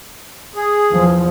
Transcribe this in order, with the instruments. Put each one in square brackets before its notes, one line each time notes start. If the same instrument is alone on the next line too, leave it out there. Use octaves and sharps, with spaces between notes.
[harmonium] G#4
[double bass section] E2 F3